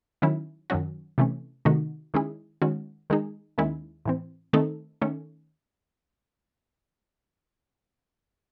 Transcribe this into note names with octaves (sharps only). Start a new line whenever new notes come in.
D#3 F#3 C#4 E4
F#2 D#3 F#3 C#4 F#4
C3 E3 A3 C#4
C3 D#3 A3 D#4 F#4
D#3 G#3 C#4 E4 G#4
D#3 G#3 C#4 F#4
D#3 G#3 D#4 G#4
D#2 D#3 G#3 C#4 E4
A2 E3 C4
D#3 A3 C4 D#4 A4
D#3 A3 C#4